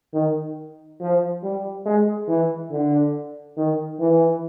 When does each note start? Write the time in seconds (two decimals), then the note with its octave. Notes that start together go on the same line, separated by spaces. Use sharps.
0.14 D#3
1.00 F3
1.43 G3
1.86 G#3
2.28 E3
2.71 D3
3.57 D#3
3.99 E3